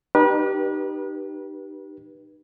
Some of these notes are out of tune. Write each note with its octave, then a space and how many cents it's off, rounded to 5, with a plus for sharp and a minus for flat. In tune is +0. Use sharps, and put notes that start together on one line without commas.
D#4 -35 G4 -15 B4 -35